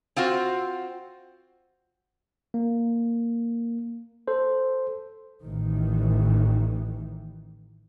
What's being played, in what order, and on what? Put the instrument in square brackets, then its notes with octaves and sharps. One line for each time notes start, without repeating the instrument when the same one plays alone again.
[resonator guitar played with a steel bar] C4 F4 F#4 C5
[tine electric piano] A#3
A4 C5
[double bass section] A1 D#3 E3